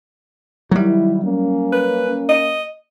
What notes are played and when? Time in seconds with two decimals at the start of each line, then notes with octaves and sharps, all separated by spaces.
0.71 D#3 F#3 G3 E4
1.24 A#3 C#4
1.72 B4
2.29 D#5